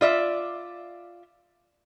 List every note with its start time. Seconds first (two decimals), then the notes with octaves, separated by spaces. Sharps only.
0.01 F4 D5 E5